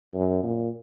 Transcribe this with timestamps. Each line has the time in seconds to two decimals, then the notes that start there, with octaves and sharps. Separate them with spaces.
0.14 F#2
0.43 A#2